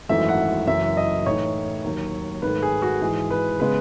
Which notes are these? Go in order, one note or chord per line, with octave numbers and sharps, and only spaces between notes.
G#1 F#2 E3 A3 D#4 E5
F#5
F#1 F#2 E3 E5
D#5
A2 E3 A3 D#4 C#5
D#2 D#3 F#3
G#2 D#3 A3 B4
G#4
F#4
G#2 E3 G#3 G#4
B4
C#3 G#3 B3 B4